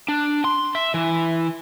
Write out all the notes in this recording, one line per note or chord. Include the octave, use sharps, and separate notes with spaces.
D4
C6
E5
E3